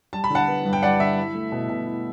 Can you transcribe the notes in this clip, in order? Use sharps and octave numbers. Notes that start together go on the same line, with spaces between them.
G3 A5
B5
D3 F#5 A5
B3
G2
G5
G3 D5 F#5
D3 E5
E4
A3
B2
B2
E4